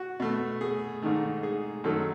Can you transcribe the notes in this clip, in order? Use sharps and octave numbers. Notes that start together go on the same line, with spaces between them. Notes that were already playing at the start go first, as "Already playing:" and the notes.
Already playing: F#4
B2 A3
G#4
G#2 D#3 A3
G#4
F#2 D#3 F#3 A3 A4